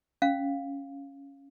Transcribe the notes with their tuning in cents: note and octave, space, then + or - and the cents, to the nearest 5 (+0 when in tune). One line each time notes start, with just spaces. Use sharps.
C#4 +0 F5 +0